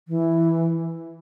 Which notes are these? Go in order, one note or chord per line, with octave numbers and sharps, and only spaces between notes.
E3